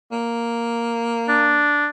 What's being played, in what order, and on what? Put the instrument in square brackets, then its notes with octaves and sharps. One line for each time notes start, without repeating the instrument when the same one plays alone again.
[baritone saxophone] A#3
[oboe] D4